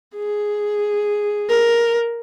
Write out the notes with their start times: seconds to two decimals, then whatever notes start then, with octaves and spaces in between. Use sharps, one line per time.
0.16 G#4
1.49 A#4